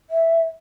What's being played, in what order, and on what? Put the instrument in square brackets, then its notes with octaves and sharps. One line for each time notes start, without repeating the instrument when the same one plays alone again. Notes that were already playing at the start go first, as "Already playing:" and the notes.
[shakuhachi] E5